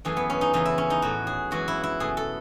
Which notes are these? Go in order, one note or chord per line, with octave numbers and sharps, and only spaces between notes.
F#2 E3 A3 G#4
B3
C#4
D#4
E2 C#3 E3 D#4
E4
C#4
D#4
A2 E3 A3 F#4
G#4
F#2 E3 G#3 F#4
E4
E4
B2 A3 G#4
A4